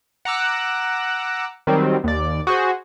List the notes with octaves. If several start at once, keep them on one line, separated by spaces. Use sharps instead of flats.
F#5 A#5 D6 E6 F#6
D#3 F#3 G3 C4
D#2 D5
F#4 G#4 C5